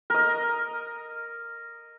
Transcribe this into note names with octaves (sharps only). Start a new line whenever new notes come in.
A#4 D#5